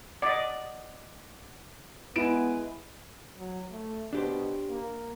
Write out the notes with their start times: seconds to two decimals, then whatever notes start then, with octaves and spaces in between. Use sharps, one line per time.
0.22 D5 D#5 F#5 D6
2.16 G#3 B3 E4 B4 D7 E7
3.38 F#3
3.71 A3
4.13 B2 D4 G4 C5
4.69 A#3